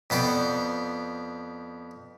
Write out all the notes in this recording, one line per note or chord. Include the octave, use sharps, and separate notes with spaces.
F2 B3 C5 D5